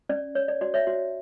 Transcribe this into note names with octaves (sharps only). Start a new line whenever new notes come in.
C#4 D5
C#5
D5
F#4 D5
C#5 E5
F#4